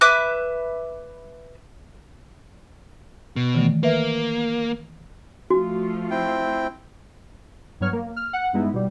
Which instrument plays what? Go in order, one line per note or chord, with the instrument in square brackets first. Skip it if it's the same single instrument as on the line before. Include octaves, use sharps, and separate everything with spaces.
[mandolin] B4 E5 D6 F#6
[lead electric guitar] B2
[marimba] D#3 E3 A3
[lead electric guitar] A#3 [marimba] B4 E5
[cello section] F3 A3 F4 [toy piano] F#4
[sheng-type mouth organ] C4 E4 G5
[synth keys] G2 F#3 B3 C#5 F6
A#3
F6
F#5
G2 G#3 B3 D#4 E4
B2 G3